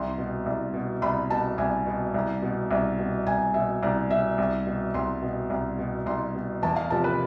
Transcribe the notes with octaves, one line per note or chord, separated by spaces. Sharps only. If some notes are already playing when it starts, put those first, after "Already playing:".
Already playing: C2 C6
B2
C2
B2
C2 B5
B2 A5
C2 G#5
B2
C2
B2
C2
B2
C2 G#5
B2 E5
C2 D5
B2 E5
C2
B2
C2 C6
B2
C2
B2
C2 C6
B2
E2 A5
F5
C3 F3 A5
B4